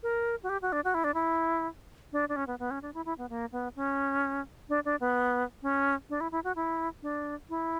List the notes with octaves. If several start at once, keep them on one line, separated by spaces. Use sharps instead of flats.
A#4
F#4
G4
F#4
D4
F#4
E4
D4
E4
D4
D4
C#4
B3
B3
C#4
D4
E4
E4
B3
A#3
B3
C#4
D4
D4
B3
C#4
D4
E4
E4
F#4
E4
D4
E4